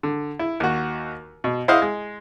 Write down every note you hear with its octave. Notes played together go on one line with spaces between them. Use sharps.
D3
E4
D#2 F#4
B2
E4 C5 D#5 F5 F#5
G#3